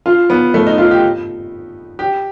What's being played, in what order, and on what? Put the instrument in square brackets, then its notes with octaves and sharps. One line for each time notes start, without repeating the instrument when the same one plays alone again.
[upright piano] F4
B3
A3
D#4
F4
G4
G4